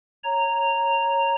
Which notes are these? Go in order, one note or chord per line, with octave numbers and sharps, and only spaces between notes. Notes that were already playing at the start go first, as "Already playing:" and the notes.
C#5 A#5